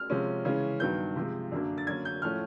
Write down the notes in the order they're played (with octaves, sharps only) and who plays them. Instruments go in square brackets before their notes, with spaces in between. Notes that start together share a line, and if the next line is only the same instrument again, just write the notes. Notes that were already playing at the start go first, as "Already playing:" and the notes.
Already playing: [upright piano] F6
C3 F3 G#3 C#4
C#3 E3 G#3 C#4
G2 D#3 F#3 B3 G6
C3 F3 G#3
F#2 D3 F#3 A#3 D4
A6
D3 F#3 A#3 C#4 G#6
G6
A2 F3 A3 C#4 F6